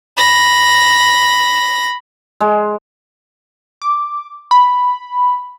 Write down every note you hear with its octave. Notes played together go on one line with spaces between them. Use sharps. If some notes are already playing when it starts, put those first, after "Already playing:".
B5 A#6
G#3
D6
B5